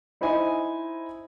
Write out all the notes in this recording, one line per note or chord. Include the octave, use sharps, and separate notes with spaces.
D#4 E4 C5 D#5 G#5